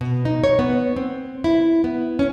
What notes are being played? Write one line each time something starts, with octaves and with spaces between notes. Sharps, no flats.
B2
D#4
C#5
B3
C4
E4
B3
C#4